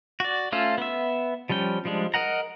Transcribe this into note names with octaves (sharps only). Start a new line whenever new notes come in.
F#4 D5
A3 C#4 F4 A4
B3 E5
F3 G3 C#4 G5
F3 G3 G#3 D4
A#4 D#5 F#5 A#5